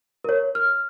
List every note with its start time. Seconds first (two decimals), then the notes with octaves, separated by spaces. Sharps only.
0.24 A#4 C#5
0.55 F6